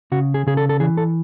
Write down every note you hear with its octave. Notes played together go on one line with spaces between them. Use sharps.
C#3 F#4
G#4
C#3 G#4
A4
A4
E3 G#4
A4